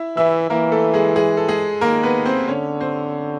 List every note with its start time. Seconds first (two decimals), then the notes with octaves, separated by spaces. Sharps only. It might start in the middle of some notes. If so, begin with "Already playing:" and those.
Already playing: E4 E5
0.16 E3 E4 E5
0.50 E3 A#3 A#4
0.72 A3 A4
0.94 G#3 G#4
1.16 G#3 G#4
1.37 A4
1.48 G#3 G#4
1.81 D#3 A#3 A#4
2.03 B3 B4
2.25 C4 C5
2.47 D3 C#4 C#5
2.81 C4 C5